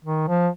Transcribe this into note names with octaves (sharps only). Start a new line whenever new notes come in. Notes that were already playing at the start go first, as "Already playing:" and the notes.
D#3
F3